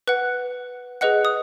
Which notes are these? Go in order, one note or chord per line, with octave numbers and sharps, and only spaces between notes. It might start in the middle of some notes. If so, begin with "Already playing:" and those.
B4 F#5 F#6
G#4 B4 D#5 F#5 F#6
D#6